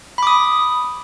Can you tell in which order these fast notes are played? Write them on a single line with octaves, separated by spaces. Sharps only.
B5 D6 D#6